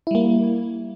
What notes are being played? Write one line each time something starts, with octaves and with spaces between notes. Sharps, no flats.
G3 A#3 E4